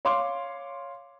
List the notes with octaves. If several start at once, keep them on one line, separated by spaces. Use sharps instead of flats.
C#5 F5 C6 D6